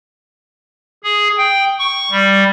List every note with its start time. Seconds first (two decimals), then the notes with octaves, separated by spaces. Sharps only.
1.04 G#4
1.38 G5
1.79 C#6
2.11 G3